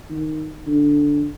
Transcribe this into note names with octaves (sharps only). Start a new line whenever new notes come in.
D#3
D3